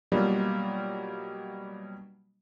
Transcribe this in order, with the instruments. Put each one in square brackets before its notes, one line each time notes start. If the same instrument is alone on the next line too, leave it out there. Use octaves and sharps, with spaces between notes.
[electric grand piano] B2 F#3 G3 A#3 D4 F4